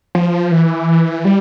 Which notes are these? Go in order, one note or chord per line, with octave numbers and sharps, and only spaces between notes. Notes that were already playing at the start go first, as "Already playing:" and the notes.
F3
E3
G3